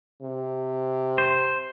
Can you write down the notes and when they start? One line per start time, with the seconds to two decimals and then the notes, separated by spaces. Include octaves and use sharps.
0.22 C3
1.18 C5